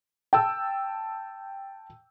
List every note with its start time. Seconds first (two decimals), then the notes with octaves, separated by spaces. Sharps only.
0.33 G5 A5 E6